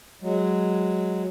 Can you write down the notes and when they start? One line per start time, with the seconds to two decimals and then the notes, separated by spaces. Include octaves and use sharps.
0.22 F#3 G#3